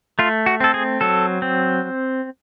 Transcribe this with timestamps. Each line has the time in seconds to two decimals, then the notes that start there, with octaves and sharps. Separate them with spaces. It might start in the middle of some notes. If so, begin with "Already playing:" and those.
0.19 A3 F4
0.46 F#4
0.60 C4 A4
0.74 G#4
1.01 F#3 A4
1.42 C4